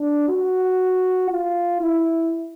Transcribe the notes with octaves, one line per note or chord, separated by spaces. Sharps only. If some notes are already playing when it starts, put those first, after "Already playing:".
Already playing: D4
F#4
F4
E4